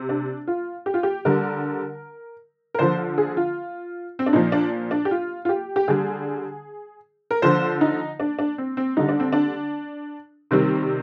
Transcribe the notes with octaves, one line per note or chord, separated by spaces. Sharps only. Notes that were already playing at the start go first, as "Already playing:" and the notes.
Already playing: C3
D4
F4
G4
F4
G4
D3 G3 A#4
A#4
D3 F3 C5
G#4
F4
C4
D4
A#2 F3 D#4
D4
D4
G4
F4
F4
G4
G4
D3 G3 G#4
A#4
D3 F3 C5
D#4
D4
D4
C4
C4
D3 G3 D#4
D4
C4
D4
C3 D#3 G3 C4